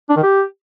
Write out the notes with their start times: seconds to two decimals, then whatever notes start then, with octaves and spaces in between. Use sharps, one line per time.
0.09 D4
0.16 D#3
0.23 G4